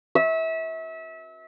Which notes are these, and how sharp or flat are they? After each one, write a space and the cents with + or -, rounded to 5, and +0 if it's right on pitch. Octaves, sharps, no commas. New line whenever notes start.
E5 -30